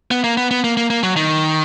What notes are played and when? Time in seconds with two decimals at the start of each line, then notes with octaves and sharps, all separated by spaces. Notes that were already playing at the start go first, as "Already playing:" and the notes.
0.11 B3
0.24 A#3
0.37 B3
0.51 B3
0.64 A#3
0.77 A#3
0.90 A#3
1.03 F#3
1.16 D#3